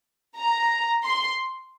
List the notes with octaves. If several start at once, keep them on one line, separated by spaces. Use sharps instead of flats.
A#5
C6